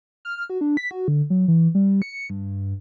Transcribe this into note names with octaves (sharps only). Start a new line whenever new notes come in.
F6
F#4
D4
B6
F#4
D3
F#3
E3
G3
C#7
G2